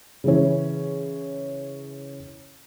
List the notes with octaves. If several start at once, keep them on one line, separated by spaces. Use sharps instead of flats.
C#3 E3 C#4